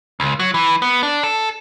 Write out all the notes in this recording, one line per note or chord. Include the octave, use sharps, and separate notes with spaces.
C#2
F#3
E3
B3
D4
A4